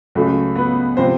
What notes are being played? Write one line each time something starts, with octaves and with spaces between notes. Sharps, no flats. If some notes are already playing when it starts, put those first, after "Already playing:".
C#2 C#3 F#3 A3
B3 B4
C3 F3 C5